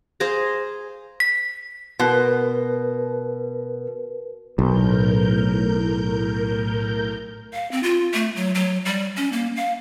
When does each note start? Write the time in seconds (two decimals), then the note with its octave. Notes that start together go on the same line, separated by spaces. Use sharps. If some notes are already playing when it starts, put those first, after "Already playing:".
0.20 G#4 C5 F5 A#5
1.20 B6
1.99 B2 A#4 B4
4.59 B1 A2 A#4 G6
7.53 F5
7.72 C4
7.83 F4
8.14 A3
8.36 F#3
8.55 F#3
8.85 G3
9.17 C#4
9.33 A#3
9.56 F5